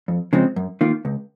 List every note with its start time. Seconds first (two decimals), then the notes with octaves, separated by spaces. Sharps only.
0.08 F2
0.33 C#3 F3 G#3 C4
0.56 F#2
0.81 D#3 A#3 F4
1.05 C#2